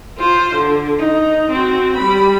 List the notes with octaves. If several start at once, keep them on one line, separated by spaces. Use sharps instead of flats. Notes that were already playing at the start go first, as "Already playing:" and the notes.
F4 C5
D3
D#4
C4 F#4
G3 B5